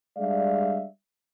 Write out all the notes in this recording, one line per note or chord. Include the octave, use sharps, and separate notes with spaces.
G3 G#3 D4 D5 E5 F5